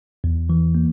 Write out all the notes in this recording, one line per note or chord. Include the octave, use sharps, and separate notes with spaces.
E2
E3
A#3